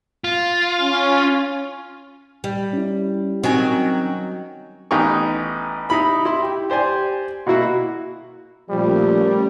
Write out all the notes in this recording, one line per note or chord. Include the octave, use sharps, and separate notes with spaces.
F4
C#4
G3
C#4 E4
D#3 F#3 C4 C#4 D#4 G5 G#5
A1 B3 D#4 G5 G#5 C#6
D#4 E4 B5
E4 C6
G4
G4 C5 D5 G#5
B2 A#3 E4 F#4
A#2 F3 G3 A3 C#4 A#4